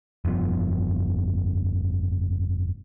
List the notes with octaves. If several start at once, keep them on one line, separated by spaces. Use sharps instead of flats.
F1 G2 F3 B3